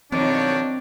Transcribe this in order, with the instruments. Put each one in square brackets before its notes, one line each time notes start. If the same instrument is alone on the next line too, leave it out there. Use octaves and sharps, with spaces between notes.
[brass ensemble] B1 C#5 [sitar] F2 D#3 [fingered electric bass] C4 [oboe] D4